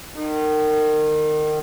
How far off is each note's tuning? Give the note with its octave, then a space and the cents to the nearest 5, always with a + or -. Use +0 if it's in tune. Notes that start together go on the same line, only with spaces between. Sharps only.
D#3 -30